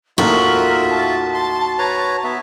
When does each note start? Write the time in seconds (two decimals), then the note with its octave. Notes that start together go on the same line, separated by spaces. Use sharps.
0.18 D#2 A2 D#3 F4 F#4 A#4 E5
0.90 A5
1.34 C6
1.79 B4 C#5 A#5
2.24 B3 E5